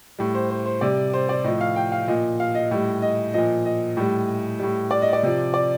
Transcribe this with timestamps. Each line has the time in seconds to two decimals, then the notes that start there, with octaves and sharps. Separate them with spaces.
0.19 A2 G3
0.35 C5
0.51 C5
0.66 C5
0.81 C3 G3 D5
1.14 C5
1.29 D5
1.44 A2 F3 D#5
1.61 F5
1.76 G5
1.92 F5
2.08 A#2 F3 D#5
2.40 F5
2.55 D#5
2.71 A2 G3
3.02 D#5
3.34 A#2 F3 D#5
3.66 D#5
3.97 A2 G3
4.59 A2 G3
4.91 D5
5.02 D#5
5.13 D5
5.23 C3 F3
5.54 D5